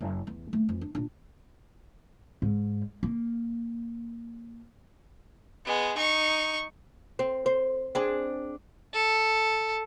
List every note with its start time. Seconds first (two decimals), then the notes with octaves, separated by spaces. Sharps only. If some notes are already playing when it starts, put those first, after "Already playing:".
0.01 F#1
0.27 E2
0.53 A3 A#3
0.69 F2 E3
0.81 D4
0.95 A#2 D4
2.42 G#2
3.03 A#3
5.65 G#3 B3
5.96 D#4 C#6
7.19 C4
7.46 C5
7.95 C4 D4 G#4
8.94 A4